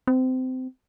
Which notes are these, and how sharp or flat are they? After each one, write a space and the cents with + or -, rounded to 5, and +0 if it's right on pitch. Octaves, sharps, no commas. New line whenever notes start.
C4 -25